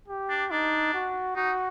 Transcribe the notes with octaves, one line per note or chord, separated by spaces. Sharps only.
G4
D4
D4 D#4
F#4
D#4 F#4